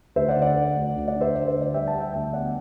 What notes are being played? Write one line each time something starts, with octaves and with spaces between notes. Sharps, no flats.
D2 C5 E5
D5 F#5
D3
D5 F#5
D4
D2
D2
D5 F#5
D4
C5 E5
D3 D5
C5
D2
D5
G3 E5 G5
F#5 A5
G3
E5 G5
D2 E5 G5
B3 D5 F#5